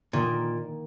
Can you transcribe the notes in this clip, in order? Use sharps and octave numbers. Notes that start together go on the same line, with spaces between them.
A#2 D#3 A#3 D#4